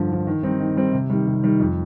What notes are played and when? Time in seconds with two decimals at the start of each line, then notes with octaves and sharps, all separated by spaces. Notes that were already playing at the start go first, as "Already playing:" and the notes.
Already playing: G2 D3 F3
0.10 D3 F3
0.27 D#3
0.43 G3 C4 D#4
0.61 D#3
0.77 G3 C4 D#4
0.93 C3
1.10 D#3 G3
1.27 C3
1.43 D#3 G3
1.59 F2